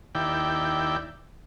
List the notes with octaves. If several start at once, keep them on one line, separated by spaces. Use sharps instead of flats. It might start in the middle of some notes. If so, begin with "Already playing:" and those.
D#2 E4 D5 G5